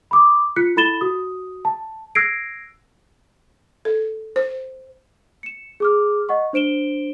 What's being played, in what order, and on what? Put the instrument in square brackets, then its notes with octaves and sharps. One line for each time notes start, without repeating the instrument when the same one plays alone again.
[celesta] B5 D6 D#6
F4 F#6 B6 C#7
E4 A4 B5 A6 E7 G7
F#4 D#6
A5
E6 F#6 G#6 A#6 C7 D7
[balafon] A4
C5
[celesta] C#7 E7
G#4 D6 F6
D#5 F#5 C#6
D4 C5 D7 E7 G7